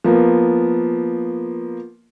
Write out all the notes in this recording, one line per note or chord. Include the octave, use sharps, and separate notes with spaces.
F3 A#3 B3